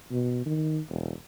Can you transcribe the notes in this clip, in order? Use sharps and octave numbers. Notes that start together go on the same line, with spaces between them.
B2
D#3
E1